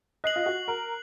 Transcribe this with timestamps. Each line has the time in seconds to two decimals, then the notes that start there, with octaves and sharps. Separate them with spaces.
0.24 D#5 F#6 C7 F#7
0.36 F4
0.46 F#4
0.68 A#4